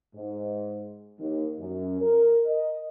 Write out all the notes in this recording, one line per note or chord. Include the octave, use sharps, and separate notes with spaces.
G#2
D#2
F#2
A#4
D#5